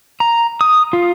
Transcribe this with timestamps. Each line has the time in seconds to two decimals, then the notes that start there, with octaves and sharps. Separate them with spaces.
0.20 A#5
0.61 D#6
0.93 F4